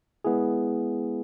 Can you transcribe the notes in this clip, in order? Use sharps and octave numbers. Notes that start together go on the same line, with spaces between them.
G#3 B3 E4 G#4